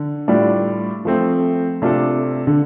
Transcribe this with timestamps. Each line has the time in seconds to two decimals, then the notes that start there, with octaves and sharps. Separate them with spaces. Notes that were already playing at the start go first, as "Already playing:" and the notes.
Already playing: D3
0.28 A2 G3 D4 F4 D5
1.05 F3 A3 C4
1.82 C3 A3 D4 F4 A4
2.47 D3